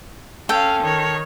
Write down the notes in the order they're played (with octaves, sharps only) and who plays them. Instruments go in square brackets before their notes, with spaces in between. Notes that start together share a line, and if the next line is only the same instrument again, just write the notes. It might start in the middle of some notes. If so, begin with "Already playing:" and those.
[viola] C#4 F5 [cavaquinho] A4 G5
[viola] D#3 C#5